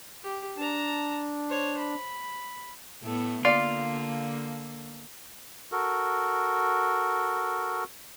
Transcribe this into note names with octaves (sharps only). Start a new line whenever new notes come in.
G4
D4 A5 A#5
C5 C#5
B5
A2 A3 B3
D3 A#3 F4 D5
F#4 A4 A#4